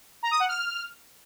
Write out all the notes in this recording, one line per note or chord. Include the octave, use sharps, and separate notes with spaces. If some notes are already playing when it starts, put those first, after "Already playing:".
A#5
D#6
F#5
F6